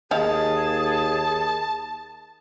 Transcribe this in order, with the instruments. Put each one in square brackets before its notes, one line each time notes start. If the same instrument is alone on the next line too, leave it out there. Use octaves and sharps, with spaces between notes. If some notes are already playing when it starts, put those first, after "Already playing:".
[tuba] D#2 [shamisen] D#4 F5 [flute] G#4 [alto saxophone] A5